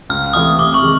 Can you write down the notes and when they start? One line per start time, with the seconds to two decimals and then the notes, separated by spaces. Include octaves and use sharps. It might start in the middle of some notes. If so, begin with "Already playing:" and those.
0.10 C#2 F6
0.33 C3 E3 A3 D#6
0.58 C3 D6
0.74 C#6
0.83 D#3 G#3